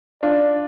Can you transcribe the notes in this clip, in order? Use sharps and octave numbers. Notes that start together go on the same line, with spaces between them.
D4 F4 D5